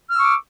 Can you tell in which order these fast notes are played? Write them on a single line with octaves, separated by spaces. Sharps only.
F6 E6 C#6 D6